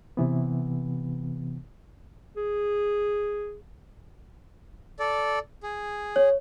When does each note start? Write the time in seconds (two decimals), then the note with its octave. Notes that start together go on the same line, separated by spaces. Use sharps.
0.17 C3 E3 B3
2.37 G#4
4.99 A4 D5
5.63 G#4
6.16 C#5